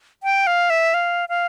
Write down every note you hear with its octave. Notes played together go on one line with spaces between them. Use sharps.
G5
F5
E5
F5
F5